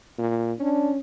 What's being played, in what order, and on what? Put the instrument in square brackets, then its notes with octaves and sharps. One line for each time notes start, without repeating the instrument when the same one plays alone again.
[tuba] A#2
[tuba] C#4 [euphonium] D4